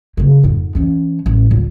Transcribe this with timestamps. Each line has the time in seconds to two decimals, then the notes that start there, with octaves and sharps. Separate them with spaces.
0.17 C#3 A#3
0.43 F2 G#2
0.75 E3 C#4
1.26 A1 A3
1.51 D2 A#2